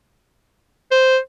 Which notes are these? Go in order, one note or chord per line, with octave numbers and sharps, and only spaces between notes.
C5